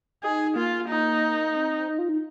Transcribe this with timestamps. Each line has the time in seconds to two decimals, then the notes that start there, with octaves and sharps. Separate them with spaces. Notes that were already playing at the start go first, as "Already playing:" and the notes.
0.23 D#4 G#4
0.56 A#3 F4
0.89 D#4
1.56 C4
1.89 D#4
1.99 F4
2.09 D#4